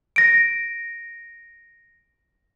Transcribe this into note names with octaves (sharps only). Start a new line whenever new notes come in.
A#6 D7